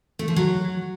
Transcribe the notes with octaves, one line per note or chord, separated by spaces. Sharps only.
A3
F3
F#3